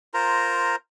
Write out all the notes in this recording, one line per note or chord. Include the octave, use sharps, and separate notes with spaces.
F4 A#4 C5 A#5